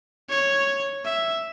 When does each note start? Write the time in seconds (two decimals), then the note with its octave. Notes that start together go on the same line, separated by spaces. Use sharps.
0.29 C#5
1.05 E5